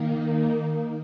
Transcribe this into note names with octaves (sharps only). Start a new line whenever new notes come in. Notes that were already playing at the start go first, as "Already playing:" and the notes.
Already playing: D#3 A#3 D#4